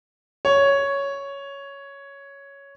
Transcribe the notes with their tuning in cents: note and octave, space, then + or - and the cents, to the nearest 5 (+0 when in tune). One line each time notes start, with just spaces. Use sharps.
C#5 +5